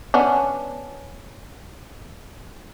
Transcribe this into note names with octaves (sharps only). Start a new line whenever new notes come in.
B3 C#4 D4